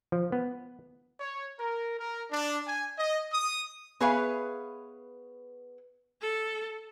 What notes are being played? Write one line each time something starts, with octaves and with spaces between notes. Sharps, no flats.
F3
B3
C#5
A#4
A#4
D4
G#5
D#5
D#6
B3 G#4 B4 C#5 E5 F5
A4